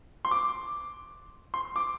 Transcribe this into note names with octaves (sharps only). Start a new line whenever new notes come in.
C6
D6
C6
D6